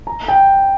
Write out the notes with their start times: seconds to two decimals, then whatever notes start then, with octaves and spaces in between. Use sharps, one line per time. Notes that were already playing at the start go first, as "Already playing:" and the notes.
0.07 A#5
0.28 G5